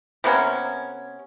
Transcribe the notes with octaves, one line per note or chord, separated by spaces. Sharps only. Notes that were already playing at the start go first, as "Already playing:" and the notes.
C3 A#3 B3 C#4